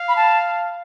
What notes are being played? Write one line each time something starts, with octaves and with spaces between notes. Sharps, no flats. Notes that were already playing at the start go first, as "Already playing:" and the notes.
Already playing: F5
B5
A5